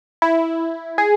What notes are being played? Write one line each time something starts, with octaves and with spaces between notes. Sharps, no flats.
E4
G#4